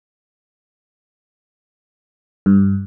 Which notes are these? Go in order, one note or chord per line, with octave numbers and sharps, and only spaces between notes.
G2